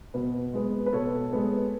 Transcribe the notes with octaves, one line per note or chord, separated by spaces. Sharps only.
B2 B4
G#3 B3
B4
B2 A4 C#5
G#3 B3